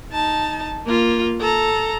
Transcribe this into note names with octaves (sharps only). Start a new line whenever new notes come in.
D#4 A5
A#3 F4
A4 A#5